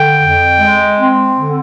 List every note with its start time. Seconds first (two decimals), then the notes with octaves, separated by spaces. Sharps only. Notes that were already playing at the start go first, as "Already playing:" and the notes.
Already playing: D3 G5
0.20 F2
0.60 G#3
0.99 C4
1.39 D3